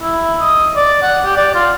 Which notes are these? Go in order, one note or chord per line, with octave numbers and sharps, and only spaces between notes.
E4
D#5
D5
F#5
G4
D5
F4